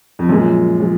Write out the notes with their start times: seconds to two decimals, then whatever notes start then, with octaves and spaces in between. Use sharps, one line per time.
0.19 F2
0.29 F#2 A#2 F3 G#3
0.80 F3 G#3